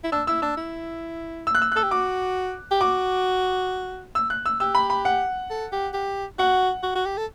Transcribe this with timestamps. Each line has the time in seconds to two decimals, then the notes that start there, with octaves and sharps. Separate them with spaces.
0.04 E4
0.12 D4 E6
0.27 E4 E6
0.42 D4 E6
0.57 E4
1.47 E6
1.55 F#6
1.62 E6
1.72 F#6
1.76 A4 E6
1.83 G4
1.91 F#4 D6
2.71 G4
2.81 F#4 D6
4.15 E6
4.30 F#6
4.46 E6
4.60 G4 E6
4.75 B5
4.90 B5
5.05 F#5
5.50 A4
5.72 G4
5.94 G4
6.38 F#4 F#5
6.83 F#4
6.95 F#4
7.06 G4
7.17 A4